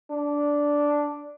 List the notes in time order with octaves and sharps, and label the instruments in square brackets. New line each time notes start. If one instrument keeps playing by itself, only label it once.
[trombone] D4